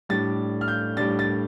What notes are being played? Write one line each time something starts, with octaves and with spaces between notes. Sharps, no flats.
A2 G3 D4 A6
F6
G6
A2 G3 D4 A6
A6